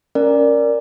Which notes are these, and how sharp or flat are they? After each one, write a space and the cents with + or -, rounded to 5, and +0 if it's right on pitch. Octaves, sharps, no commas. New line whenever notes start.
C#4 +0 A#4 +0 D5 +0